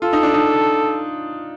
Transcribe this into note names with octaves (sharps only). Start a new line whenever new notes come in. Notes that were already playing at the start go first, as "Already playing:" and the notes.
F4 A4
D#4
D4
D#4